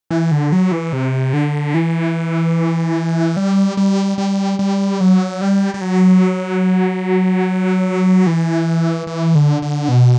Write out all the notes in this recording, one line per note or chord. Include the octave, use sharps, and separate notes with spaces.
E3
D3
F#3
E3
C3
D3
E3
G3
G3
G3
G3
F#3
G3
G3
F#3
E3
E3
D3
D3
B2